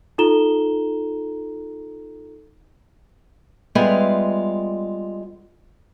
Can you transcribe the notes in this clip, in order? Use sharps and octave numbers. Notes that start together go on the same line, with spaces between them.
D#4 F4 A4 A#5 E7 G7
G3 G#3 B3 F4 G#4 E5